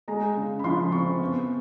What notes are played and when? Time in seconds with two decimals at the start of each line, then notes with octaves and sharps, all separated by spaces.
0.08 G#3 A#5
0.36 C#3
0.59 B5
0.64 F3 C6
0.92 C4 C#6
1.20 B3